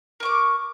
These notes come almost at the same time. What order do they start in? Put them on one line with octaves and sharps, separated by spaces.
A#4 C#6 D6